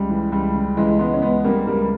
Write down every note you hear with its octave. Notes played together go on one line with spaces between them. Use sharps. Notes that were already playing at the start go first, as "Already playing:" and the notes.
Already playing: C#2 G3
E3
C#2 G3
C#3
C#2 E3 G#3
E3 G#3 B3
C#4
C#2 G#3 B3
C#3 G3 A#3
C#2 G3 A#3